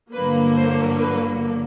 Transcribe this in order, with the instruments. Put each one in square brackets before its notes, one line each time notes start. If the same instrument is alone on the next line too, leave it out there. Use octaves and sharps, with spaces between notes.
[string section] G1 G2 D3 F#3 A#3 B4
C5
B4